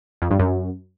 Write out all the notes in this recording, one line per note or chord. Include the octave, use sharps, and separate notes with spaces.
F2
G2
F#2